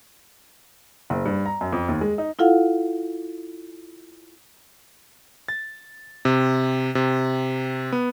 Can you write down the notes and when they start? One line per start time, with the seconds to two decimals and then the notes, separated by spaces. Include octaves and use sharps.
1.10 F#1
1.25 G2
1.46 A#5
1.61 F#2
1.72 F2
1.88 D#2
2.01 G#3
2.18 D#4
2.39 E4 F4 A4 F5 F#5
5.48 A6
6.25 C3
6.95 C3
7.92 B3